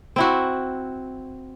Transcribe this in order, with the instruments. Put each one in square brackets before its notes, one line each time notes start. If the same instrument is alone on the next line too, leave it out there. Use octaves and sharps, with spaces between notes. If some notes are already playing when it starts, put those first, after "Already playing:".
[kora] C4 E4 F#4